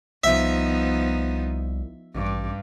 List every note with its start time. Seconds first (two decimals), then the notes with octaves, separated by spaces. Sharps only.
0.24 C2 F3 B3 D#4 E5
2.14 A1 G2